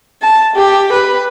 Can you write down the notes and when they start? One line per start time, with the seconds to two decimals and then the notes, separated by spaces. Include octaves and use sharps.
0.22 A5
0.56 G4
0.92 B4